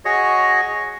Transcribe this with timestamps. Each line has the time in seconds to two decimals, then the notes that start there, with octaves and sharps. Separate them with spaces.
0.05 F#4 G#4 C#5 D#5 C#6